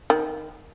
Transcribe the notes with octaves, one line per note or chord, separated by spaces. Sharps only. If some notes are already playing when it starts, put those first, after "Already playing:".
D#3